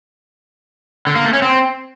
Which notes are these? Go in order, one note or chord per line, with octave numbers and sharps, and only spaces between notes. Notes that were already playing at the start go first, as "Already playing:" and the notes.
D3
A#3
A3
C#4
C4